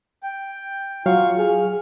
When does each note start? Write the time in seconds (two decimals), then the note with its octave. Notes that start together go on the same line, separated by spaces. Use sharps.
0.23 G5
1.06 F#3 F4 F5 C#6
1.38 G#4 F6